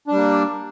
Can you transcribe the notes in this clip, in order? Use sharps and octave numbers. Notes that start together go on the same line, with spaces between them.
G3 A#3 D4